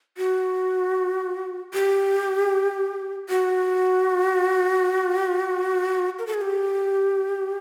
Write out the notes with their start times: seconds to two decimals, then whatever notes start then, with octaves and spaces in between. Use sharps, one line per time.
0.18 F#4
1.74 G4
3.29 F#4
6.19 A#4
6.27 A4
6.34 G#4
6.41 G4